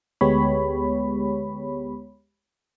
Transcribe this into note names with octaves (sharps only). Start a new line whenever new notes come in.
D2 G#3 B3 G4 C#5 B5